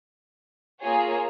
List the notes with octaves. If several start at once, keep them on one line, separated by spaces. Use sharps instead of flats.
A#3 F4 G#4 C#5